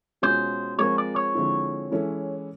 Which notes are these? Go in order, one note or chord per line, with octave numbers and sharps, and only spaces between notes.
B2 G#3 C#4 F4 G#4 C5
F3 G#3 C4 F4 A#4 C#5
D5
C#5
D3 F3 G#3 C4 E4
E3 G#3 C#4 E4 A4